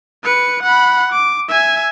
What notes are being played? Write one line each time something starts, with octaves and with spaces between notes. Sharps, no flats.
B4 C#7
F#5 B5
D6
E5 G#5